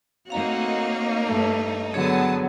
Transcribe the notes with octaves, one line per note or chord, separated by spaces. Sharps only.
A3 A#3 C4 D#4 F#4 C#5 F5 A#5
G2 A3
D3 F#3 B3 G#4 C#5 A5 D#6